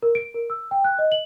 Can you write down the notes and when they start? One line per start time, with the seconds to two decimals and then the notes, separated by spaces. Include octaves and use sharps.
0.02 A#4
0.15 D7
0.34 A#4
0.50 E6
0.71 G5
0.84 F#6
0.99 D#5
1.12 F#7